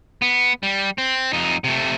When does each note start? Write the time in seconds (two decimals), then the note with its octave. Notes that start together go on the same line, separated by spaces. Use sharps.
0.22 B3
0.63 G3
0.98 C4
1.33 F2 D#4
1.64 C3 A3